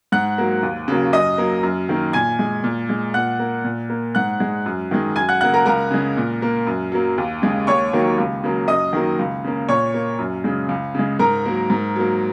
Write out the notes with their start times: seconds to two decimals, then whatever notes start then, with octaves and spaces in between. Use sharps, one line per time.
0.12 G#2 F#5 F#6
0.38 F#3 A#3
0.63 D#2
0.88 C#3 F#3 A#3
1.13 F#2 D#5 D#6
1.38 F#3 A#3
1.63 F#2
1.89 D#3 A#3
2.13 A#2 G#5 G#6
2.39 G#3
2.64 A#2
2.89 G#3
3.14 A#2 F#5 F#6
3.39 A#3
3.64 A#2
3.90 A#3
4.15 G#2 F#5 F#6
4.40 G#3
4.66 F#2
4.91 D#3 G#3
5.16 F#2 G#5 G#6
5.29 F#5 F#6
5.41 C#3 A#3 F#5 F#6
5.54 A#4 A#5
5.66 C#2 A#4 A#5
5.91 C#3 G#3
6.17 A#2
6.42 A#3
6.67 F#2
6.92 F#3 A#3
7.18 D#2
7.42 C#3 G#3
7.67 D#2 C#5 C#6
7.93 D#3 F#3 A#3
8.18 C#2
8.44 C#3 F#3 A#3
8.68 F#2 D#5 D#6
8.93 D#3 F#3 A#3
9.19 C#2
9.44 C#3 A#3
9.69 A#2 C#5 C#6
9.94 A#3
10.19 F#2
10.44 C#3 G#3
10.69 C#2
10.95 C#3 G#3
11.19 G#2 A#4 A#5
11.46 F#3 A#3
11.70 G#2
11.96 F#3 A#3